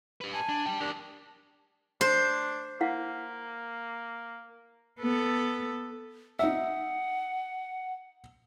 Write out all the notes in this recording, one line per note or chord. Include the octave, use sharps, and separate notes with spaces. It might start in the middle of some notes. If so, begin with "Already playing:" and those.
G4 B4
G#5 A5
D4
G3 G5
D4 G4 A#4
D4 C5
A#3 E4 F5 F#5
B3 A4
D#4 E5 F#5